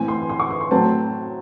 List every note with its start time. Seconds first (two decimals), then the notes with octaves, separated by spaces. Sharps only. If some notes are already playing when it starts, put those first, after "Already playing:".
Already playing: A2 E3 C4 G#5
0.08 C6
0.29 C6
0.40 C#6
0.50 C6
0.61 C6
0.71 A2 F#3 A3 C4 A5